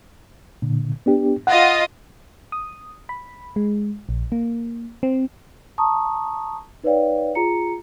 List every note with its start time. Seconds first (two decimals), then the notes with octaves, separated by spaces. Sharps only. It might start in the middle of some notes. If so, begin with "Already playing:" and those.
0.62 A#2 D3
1.06 B3 D4 G4
1.47 F4 D#5 F#5
2.52 D#6
3.09 B5
3.56 G#3
4.09 A#1
4.32 A#3
5.03 C4
5.78 A5 A#5 C#6 D#6
6.83 D#4 B4 C#5 D5 F5 G5
7.35 F4 G#4 A#5 C#7